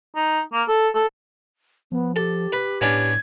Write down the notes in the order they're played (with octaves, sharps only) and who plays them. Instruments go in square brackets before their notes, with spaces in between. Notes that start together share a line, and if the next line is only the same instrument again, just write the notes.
[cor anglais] D#4
A#3
A4
A4
[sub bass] F3 [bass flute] B3
[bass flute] G4 [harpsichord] A4
[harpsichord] B4
[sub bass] A2 [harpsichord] B3 C#4 D4 [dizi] G#6